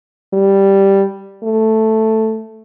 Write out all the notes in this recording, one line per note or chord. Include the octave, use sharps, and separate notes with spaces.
G3
A3